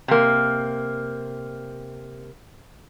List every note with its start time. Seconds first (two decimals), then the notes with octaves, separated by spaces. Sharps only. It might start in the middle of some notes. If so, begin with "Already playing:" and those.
0.08 C3 A#3